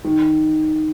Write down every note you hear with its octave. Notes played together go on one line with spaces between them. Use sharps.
D#3